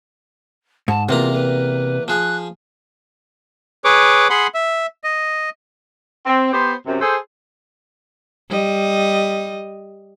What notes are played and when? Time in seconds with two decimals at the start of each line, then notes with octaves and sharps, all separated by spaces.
0.88 G#2 A5
1.09 E2 C3 A#3 F4 A#5
1.33 B4
2.08 F3 G#4 F#6
3.84 G#4 B4 C#5 D6
4.30 G#4 F#5 B5 C6
4.54 E5
5.04 D#5
6.25 C4
6.52 B3 G4 C5
6.86 F#2 C3
7.01 G#4 A4 C5
8.50 G3 D#5